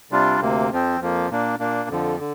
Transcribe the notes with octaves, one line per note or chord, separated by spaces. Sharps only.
C3 G3 D4 F4
D2 C3 A#3
F2 F3 C4
F2 F3 A#3
A#2 A#3 D4
A#2 A#3 D4
F2 D3 F3
D3